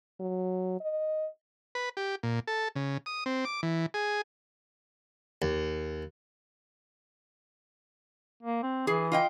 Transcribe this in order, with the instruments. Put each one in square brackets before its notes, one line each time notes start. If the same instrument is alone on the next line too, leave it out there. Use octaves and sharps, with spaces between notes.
[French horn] F#3
D#5
[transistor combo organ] B4
G4
A#2
A4
C#3
D#6
C4
D6
E3
G#4
[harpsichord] D#2
[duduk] A#3
C4
[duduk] E3 [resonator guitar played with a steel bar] G#4
[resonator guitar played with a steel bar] F4 D#5 G5